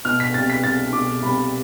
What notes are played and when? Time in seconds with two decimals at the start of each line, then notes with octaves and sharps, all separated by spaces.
0.05 B2 F6
0.20 B6
0.34 C2 A6
0.50 B6
0.64 C2 A6
0.93 B2 D6
1.23 C2 B5